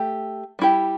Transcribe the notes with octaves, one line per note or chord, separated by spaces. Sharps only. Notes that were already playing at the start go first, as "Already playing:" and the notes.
Already playing: A3 G4
G3 E4 G4